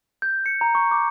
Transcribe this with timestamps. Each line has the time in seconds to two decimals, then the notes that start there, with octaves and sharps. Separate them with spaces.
0.22 G6
0.46 C#7
0.61 A#5
0.75 C#6
0.91 D6